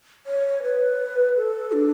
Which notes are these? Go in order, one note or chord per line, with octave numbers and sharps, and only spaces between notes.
C#5
B4
A4
D4